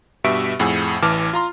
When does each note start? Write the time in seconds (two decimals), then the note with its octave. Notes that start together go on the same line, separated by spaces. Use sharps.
0.24 G2 B2 G4 E5 C#6 D7
0.60 F2 A2 G#4 F#5 G#5 E6
1.02 A1 E3 A5 D6 F6
1.33 F4 A#5 C6